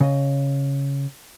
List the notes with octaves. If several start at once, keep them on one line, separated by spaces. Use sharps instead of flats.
C#3 D#5